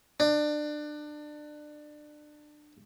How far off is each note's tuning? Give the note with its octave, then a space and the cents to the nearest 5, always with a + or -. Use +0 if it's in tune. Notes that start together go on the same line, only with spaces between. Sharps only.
D4 +25